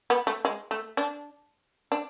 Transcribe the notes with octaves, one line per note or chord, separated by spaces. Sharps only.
B3
A3
G#3
A3
D4
D4